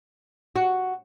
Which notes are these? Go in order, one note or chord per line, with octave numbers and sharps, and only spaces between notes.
F#4